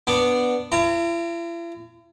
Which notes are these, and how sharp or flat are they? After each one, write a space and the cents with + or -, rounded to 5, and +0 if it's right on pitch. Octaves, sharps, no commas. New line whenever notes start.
B3 +0 D4 +0
E4 +45 A#5 -30